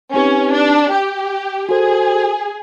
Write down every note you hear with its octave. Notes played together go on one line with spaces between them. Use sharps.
C4 C#4 D#4 G4 B4
D4
G4
F#4 G#4 A4 C5